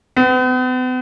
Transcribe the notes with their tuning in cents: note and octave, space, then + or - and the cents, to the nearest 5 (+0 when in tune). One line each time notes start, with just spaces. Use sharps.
B3 +45